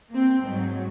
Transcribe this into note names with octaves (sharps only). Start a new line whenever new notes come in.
A#3 C4
G#2 F#3